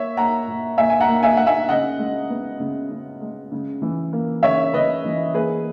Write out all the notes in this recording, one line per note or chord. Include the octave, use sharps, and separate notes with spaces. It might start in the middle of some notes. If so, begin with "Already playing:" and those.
Already playing: A#3 C#5 E5
A#3 F#5 A#5
A#2
A#2 E5 G#5
G#5
F#5 A#5
A#3
E5 G#5
A#3 F#5
E5 G#5
C#3 D#5 F#5
G#3
B3
C#3
C#3
G#3
C#3
E3
A#3
C#3 C#5 E5
C#3 B4 D#5
E3
A#3 G#4 B4